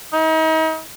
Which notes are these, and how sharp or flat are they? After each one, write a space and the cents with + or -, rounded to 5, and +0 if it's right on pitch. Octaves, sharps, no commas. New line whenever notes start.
D#4 +40